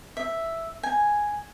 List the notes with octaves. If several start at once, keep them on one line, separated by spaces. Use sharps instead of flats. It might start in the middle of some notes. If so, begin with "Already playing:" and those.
E5
G#5